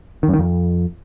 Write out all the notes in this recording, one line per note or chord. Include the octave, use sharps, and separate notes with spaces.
D#3
F#2
D#3
F2